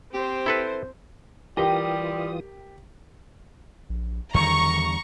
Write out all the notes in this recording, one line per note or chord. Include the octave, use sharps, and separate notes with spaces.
C4 G4 C5
E4 A4 B4
E3 G3 F4 G4 A#4 G5 D#6
A#1
E2 D3 D#3 G3 A#5 C#6